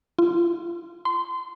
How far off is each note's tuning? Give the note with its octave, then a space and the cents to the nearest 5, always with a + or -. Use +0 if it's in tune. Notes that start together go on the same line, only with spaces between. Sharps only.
F4 -30
C6 -25